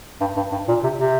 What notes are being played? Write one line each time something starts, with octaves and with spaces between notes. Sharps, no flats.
G2
G2
G2
A#2
C3
C3